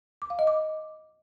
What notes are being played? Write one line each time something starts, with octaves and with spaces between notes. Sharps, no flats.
D6
F5
D#5
D6